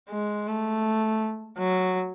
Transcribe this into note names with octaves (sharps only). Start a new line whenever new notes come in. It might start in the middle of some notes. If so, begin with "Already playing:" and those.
G#3
A3
F#3